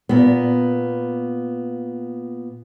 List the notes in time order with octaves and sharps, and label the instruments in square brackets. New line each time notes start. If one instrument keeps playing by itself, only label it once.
[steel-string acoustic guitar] A#2 B3